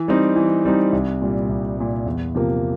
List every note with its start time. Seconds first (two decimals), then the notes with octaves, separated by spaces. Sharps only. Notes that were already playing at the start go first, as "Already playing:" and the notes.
Already playing: E3
0.08 G3 C4 D#4
0.36 E3
0.65 G3 C4 D#4
0.92 C2
1.21 A#2 G3
1.49 C2
1.77 A#2 G3
2.06 E2
2.35 C3 F3 A#3